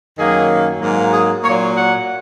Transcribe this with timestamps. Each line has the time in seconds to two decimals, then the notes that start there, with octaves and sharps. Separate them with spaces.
0.17 F#2 D#3 F#3 A#3 G#4
0.80 G#2 F#3 A#3
1.12 G#4
1.43 A#2 F#3 A#3 C#5
1.75 F#5